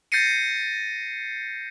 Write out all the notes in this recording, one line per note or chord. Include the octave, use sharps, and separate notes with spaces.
G6 A6 A#6 C7 C#7 D#7